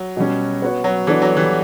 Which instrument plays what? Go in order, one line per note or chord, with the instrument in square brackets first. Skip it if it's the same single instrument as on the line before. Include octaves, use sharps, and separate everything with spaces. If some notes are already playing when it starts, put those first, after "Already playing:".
Already playing: [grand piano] F#3
[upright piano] B2 G3 C#4
B3 F#4 C#5
[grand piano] F#3
[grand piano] E3 [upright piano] B3 D4 F#4 A4 D5
[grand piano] F#3
E3 G3